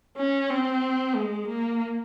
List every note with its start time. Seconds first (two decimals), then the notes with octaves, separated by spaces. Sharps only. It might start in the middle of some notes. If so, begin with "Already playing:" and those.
0.17 C#4
0.50 C4
1.16 G#3
1.48 A#3